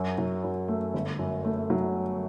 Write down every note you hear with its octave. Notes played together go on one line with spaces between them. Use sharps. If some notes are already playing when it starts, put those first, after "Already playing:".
Already playing: F#2 F#3
F#3
F#2
A3
G1
F#2
A3
F#3